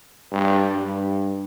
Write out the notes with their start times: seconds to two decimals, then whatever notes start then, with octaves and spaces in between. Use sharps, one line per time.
0.32 G2
0.74 G2